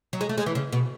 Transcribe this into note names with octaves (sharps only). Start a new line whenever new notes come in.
F#3
G#3
A3
G#3
E3
C#3
B2